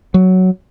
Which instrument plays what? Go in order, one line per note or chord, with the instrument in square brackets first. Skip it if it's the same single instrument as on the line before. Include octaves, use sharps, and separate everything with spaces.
[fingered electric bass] F#3